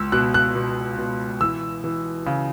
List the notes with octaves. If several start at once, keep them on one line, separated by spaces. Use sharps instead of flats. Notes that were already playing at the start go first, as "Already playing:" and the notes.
Already playing: C#2 E6
B2 F#6
F#6
B2
B2
E3 E6
E3
C#3